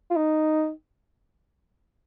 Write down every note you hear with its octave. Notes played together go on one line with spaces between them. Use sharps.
F4
D#4